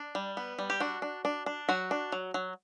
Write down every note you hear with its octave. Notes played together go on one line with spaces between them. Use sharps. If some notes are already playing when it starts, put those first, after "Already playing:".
Already playing: D4
G3
B3
G3
G4
D4 F#4
D4
D4
D4
F#3 F#4
D4
F#3
F#3